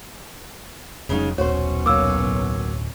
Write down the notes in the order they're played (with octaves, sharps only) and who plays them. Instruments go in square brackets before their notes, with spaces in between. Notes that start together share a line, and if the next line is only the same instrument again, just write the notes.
[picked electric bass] F1 F#3 [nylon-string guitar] C#3 G#3 D#4
[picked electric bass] D#1 [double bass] B1 C#4 [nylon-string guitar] F#4 C5 [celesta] C#5
[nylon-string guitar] F#3 A#3 [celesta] D6 E6
[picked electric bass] D1